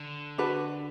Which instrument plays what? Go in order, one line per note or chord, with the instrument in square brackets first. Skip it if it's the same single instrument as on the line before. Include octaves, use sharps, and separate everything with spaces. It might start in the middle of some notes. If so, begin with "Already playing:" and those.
Already playing: [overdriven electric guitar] D3
[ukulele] D4 F#4 B4